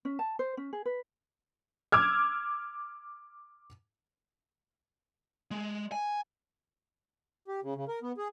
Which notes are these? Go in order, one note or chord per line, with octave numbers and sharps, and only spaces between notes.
C#4
A5
C5
C#4
G#4
B4
D6 E6 F6 G#6
G#3
G#5
G4
C#3
C#3
A#4
B3
G#4